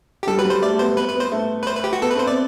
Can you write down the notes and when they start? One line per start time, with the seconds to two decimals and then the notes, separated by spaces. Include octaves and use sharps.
0.23 G4
0.27 G3 A4
0.38 F#3 B4
0.45 G3
0.50 C5
0.62 A3 D5
0.73 A3
0.79 B3 C5
0.97 B3 B4
1.08 B4
1.15 B3
1.20 C5
1.32 A3
1.63 B4
1.67 C5
1.76 B4
1.84 G4
1.93 F#4
2.01 B3 A4
2.11 B4
2.15 C4 C5
2.27 B3 D5